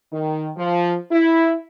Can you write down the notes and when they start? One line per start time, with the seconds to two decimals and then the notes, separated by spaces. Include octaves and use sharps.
0.13 D#3
0.57 F3
1.12 E4